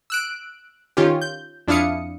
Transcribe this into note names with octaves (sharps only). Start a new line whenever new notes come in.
E6 F#6 D7
D#3 C#4 F4 G4
G6
F2 D4 E4 F5 D#6 C#7